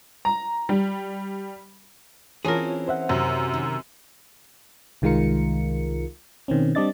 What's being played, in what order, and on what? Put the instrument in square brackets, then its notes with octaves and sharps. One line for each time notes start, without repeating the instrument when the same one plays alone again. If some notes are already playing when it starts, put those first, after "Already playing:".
[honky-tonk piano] A#5
G3
[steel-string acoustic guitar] E3 C4 C#4 [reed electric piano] F4 C#5 A5 [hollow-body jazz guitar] G#4 A#4
[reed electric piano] C5 E5 F#5
[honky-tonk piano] F#2 [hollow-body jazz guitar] C3 [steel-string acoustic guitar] D#3
[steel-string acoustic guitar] D#3
[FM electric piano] C2 D#3 G#3 F4 A#4 C#7
B2 D#3 C4 C#4
G3 C4 D4 D5 D#5 A6